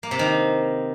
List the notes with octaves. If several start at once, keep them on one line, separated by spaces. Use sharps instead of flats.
A#3
C3
D#3